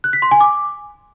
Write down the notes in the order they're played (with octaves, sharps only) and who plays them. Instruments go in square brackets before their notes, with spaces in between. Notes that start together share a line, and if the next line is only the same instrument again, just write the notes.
[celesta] F#6
B6
C6
G#5
D6